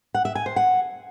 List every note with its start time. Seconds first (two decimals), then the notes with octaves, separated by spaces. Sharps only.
0.14 F#5
0.25 E5
0.35 G#5
0.46 C5
0.56 F#5